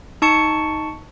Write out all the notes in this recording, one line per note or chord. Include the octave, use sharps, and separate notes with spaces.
D#4 A5 C#6 C#7